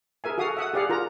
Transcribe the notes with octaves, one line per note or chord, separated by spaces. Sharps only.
G#4 A#4 E5 G#5
F#4 A4 F5 D#6
E5 F#5 D#6
G4 G#4 D5 F5 F#5
F4 A#4 A#5